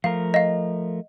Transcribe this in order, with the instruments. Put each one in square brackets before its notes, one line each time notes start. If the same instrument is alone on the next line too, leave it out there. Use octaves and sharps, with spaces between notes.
[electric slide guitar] F3 A3 A#4 [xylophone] F5
[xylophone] D#5 F5